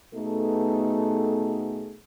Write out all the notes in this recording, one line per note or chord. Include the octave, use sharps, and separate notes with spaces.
B2 A3 B3 D#4 G#4 A4